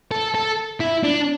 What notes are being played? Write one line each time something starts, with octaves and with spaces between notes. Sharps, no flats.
A4
A4
E4
D4